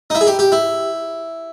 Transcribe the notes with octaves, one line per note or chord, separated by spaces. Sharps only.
D#4
E4
G#4
G4
G4
E4